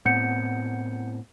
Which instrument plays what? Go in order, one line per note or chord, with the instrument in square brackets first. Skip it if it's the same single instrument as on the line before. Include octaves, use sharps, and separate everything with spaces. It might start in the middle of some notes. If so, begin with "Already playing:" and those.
[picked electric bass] A2 B3 C4 [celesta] F#5 G6 C#7